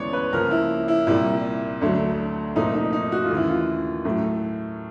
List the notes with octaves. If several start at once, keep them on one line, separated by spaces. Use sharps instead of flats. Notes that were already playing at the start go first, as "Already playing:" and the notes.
Already playing: D2 C#3 E3 G#3 B3 C#5 D5
B4
C#2 C#3 F3 A#3 A#4
E4
E4
C2 A#2 G3 E4
D2 D3 F#3 A3
C2 A#2 F3 A3 D#4
D#4
D#4
F#4
F4
D#2 C#3 E3 A3
E4
F4
A2 F#3 A3